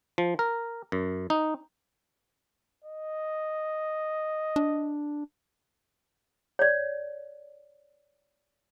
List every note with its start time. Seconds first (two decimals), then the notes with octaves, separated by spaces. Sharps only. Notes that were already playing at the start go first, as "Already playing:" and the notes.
0.18 F3
0.39 A#4
0.92 F#2
1.30 D#4
2.84 D#5
4.56 D4
6.59 C#5 D5